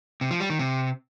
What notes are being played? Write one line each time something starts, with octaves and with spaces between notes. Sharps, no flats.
C3
F3
G3
D#3
C3